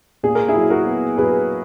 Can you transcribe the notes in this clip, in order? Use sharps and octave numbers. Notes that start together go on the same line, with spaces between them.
A#2 G#4
A#4
E4 G#4
F#3
F#4 A#4
B3
F#3 G#4 B4